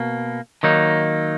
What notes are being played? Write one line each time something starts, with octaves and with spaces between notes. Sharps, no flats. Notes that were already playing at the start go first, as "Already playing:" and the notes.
Already playing: B2 A#3
D#3 F#3 A#3 D#4